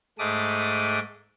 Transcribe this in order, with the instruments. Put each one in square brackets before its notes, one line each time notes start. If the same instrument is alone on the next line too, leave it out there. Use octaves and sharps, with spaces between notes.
[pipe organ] G#2 G#3 A3 D6 D#6